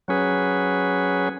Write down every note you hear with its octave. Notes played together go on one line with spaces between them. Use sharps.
F#3 C#4 G#4 B4